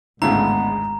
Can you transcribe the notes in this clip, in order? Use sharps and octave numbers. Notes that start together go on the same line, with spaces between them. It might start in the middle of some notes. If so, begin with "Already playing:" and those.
G#1 D2 A2 C#3 G#3 B3 A#5